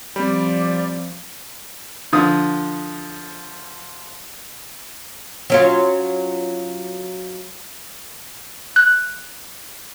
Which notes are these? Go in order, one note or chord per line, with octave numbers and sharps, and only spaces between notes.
F3 G3 C4 D5 B5
D3 F3 D#6
F#3 C#4 F4
F#6